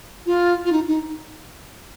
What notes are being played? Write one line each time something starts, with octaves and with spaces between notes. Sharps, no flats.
F4
F4
D#4
D#4